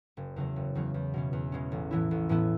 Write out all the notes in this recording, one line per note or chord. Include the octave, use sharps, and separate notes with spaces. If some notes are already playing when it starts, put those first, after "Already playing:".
F#1
E2 C#3 F#3
F#1
E2 C#3 F#3
E2
B2 G#3 C#4
E2
B2 G#3 C#4
A1
A2 E3 B3 E4
A1
A2 E3 B3 E4